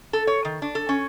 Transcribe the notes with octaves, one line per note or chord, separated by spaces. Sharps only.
A4
C#5
D#3
D4
A4
C#4